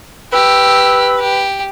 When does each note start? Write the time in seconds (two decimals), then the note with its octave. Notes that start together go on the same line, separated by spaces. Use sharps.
0.33 G4 B4 E6
1.19 G4